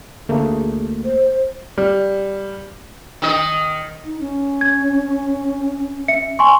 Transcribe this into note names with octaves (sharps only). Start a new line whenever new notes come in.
D2 A3 A#3 G#4
C5
G3
D#3 D#5
D#4
C#4
G#6
E5 C#7
G#5 C6 C#6